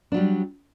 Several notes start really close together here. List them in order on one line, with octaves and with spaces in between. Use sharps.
D4 F#3 G3